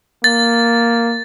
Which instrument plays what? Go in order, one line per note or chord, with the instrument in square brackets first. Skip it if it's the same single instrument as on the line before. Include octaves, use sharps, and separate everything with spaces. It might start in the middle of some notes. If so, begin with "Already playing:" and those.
[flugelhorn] A#3 [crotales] A6